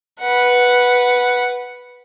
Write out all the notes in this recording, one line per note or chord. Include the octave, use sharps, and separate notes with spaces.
B4 F#5